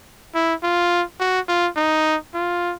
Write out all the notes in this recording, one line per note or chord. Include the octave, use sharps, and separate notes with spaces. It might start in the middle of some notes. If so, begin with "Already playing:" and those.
E4
F4
F#4
F4
D#4
F4